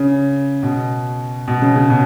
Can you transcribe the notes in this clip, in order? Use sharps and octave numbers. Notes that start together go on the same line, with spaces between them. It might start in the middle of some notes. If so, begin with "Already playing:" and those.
Already playing: C#3
B2
B2
C#3
C#3
B2